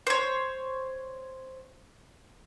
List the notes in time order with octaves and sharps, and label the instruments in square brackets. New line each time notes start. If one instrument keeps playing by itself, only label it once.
[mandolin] C5 C#5